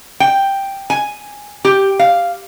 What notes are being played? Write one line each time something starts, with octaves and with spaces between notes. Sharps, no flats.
G5
G#5
G4
F5